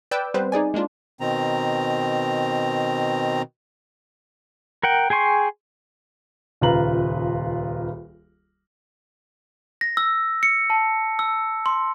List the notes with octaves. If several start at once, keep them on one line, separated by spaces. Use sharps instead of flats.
B4 D5 G5 D6 E6 G6
G3 B3 C4 B4 C5
D#4 G#4 D5 G#5
G#3 A#3 D4 F4
B2 D#3 C4 A#5
A#4 F#5 G5
G#4 G5 G#5 C6 C#6
D#1 C#2 F4 B4 A#5 F#7
A#6
E6
C#7
A5
E6
C6